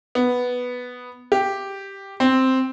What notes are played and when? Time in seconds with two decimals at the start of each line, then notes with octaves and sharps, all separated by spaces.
0.15 B3
1.32 G4
2.20 C4